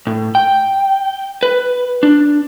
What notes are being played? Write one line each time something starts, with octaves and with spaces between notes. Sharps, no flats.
A2
G5
B4
D4